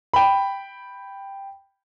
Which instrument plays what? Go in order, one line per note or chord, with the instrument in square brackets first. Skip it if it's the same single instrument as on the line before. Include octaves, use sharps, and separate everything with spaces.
[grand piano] G5 B5